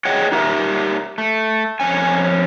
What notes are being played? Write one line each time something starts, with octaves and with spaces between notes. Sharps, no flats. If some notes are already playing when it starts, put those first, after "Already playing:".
G#4 C#5 D#5 F#5 G5
D#4 G4 A#4 E5
A3
F2 C#4 G#5